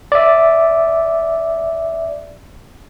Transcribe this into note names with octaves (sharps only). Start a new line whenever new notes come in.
D5 E5